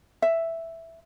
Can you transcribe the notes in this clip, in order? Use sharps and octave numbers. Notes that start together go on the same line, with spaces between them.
E5